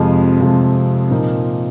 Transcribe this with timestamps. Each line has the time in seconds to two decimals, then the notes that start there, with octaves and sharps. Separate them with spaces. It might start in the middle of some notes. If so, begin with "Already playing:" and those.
Already playing: F2 C3 F3 G#3
0.40 F2 C3 F3 G#3
1.11 A#2 F3 A#3 D#4